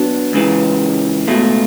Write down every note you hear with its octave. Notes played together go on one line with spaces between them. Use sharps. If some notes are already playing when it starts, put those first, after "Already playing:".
Already playing: F#3 B3 D4
C#2 C#3 E3
C#2 B2 A3